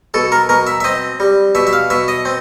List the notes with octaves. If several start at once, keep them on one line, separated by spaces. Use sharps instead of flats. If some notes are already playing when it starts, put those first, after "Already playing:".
B2 A4
A#4
B2 A#4
E5
E5
C4 D#5
G3
B2 E5
E5
F5
B2 E5
D#5
C4